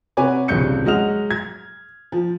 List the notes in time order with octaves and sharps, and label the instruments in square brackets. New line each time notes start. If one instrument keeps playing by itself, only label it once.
[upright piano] C3 F#4 B4 C#5 G#5 D6
D#1 C2 G2 C#3 G6 C#7
F#3 G#3 D#5 F#5 F6 F7
G#6
F3